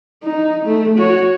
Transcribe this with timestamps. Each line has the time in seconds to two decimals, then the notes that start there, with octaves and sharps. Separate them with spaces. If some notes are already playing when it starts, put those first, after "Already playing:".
0.24 D#4
0.66 A3
0.99 F#4 C#5